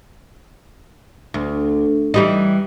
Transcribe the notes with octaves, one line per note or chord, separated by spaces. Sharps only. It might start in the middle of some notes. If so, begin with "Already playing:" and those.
D2
E3 G3 D#4